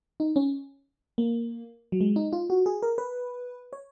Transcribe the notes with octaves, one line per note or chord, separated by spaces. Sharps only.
D#4
C#4
A#3
F#3
G#3
D#4
F4
F#4
G#4
A#4
B4
C#5